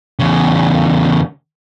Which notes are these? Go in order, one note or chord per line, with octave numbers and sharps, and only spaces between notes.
E2 C#3